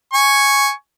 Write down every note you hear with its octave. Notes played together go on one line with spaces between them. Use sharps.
G#5 C#6